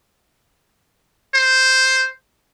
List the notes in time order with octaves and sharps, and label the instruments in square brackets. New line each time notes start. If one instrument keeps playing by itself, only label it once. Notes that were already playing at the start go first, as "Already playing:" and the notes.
[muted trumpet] C5